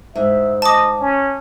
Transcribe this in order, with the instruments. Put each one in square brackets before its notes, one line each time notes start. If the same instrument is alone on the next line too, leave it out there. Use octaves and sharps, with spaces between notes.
[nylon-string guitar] G#2 [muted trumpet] E5
[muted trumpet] D#5 [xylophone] A5 D6
[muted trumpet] C#4